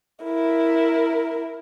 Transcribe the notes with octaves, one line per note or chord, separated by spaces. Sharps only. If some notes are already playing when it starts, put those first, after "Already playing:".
E4 A#4